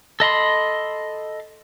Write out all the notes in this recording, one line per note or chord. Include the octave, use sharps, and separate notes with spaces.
A4 D#5 B5 C6